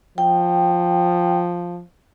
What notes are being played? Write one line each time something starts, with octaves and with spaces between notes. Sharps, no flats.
F3 G5